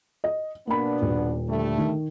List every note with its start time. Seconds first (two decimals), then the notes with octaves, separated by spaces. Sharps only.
0.24 D#5
0.67 B2 A#3 B3 D4 B5
1.01 D#1
1.48 D3 G3 A3
1.78 D#3